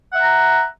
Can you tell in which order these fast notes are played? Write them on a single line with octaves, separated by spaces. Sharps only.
F#5 E5 A#5